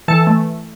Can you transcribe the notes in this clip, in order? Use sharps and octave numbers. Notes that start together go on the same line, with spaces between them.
E3 A4 A5
A3